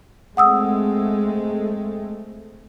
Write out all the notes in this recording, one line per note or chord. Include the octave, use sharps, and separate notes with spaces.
G#3 A3 C4 F#5 D#6 E6